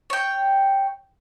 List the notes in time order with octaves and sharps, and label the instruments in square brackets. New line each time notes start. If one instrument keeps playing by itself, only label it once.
[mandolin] C#5 G5